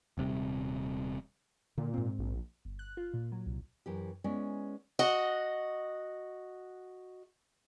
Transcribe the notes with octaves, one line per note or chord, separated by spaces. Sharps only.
D#1 C3 G3
A#2 D3
G#2 C4
A#1
G1
F#6
F4
A#2
F#3
C2
F#2 E3 G4
G#3 B3 C#4 E4 D5
F#4 D#5 F#5